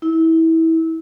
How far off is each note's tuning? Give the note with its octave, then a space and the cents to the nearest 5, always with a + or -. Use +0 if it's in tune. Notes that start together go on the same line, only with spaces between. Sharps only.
E4 -25